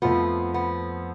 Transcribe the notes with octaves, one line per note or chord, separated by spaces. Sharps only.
F2 F3 A3 B3 F4
B3